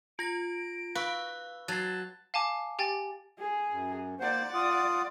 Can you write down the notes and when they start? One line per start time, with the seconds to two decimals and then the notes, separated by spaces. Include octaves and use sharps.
0.19 F4 A#6 D7
0.95 B4 F5 C#6 E6
1.68 F#3 A5 A6 C7
2.34 F5 G#5 A5 D6
2.79 G4 G5 G#5 A6
3.38 G#4
3.71 F#2
4.20 A#3 C5 D5 F#5
4.54 F4 D#6